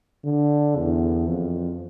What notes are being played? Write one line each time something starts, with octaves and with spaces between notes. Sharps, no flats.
D3
E2
F2